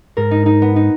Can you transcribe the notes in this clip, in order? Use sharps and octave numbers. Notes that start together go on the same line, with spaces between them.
G#2 A#4
D#4
D#4
B3
D#4